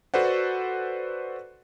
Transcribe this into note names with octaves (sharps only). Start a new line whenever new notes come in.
F#4 A4 B4 C5 D5 F#5